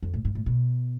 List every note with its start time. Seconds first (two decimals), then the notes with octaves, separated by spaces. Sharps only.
0.03 F2
0.14 A2
0.25 G#2
0.35 A2
0.46 B2